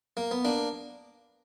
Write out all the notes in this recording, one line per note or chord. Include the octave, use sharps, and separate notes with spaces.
A#3
B3
A#3 D4